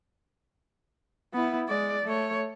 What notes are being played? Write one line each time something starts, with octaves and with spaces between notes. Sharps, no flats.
B3 E4
G#3 D5
A3 C#5